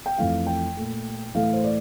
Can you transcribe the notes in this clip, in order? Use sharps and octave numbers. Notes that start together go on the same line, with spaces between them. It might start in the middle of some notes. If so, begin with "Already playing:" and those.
G5
F2 E3 A3 F5
G5
A#2 A3
A2 E3 A3 F5
C5
D5